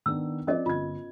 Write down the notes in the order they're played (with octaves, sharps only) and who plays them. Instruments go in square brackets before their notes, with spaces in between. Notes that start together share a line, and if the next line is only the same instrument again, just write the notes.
[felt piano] D#3 B3 D4 [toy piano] E6
[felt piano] F3 C4 D5 [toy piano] C#4 A#4 D#5
[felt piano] G1 G#6 [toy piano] F4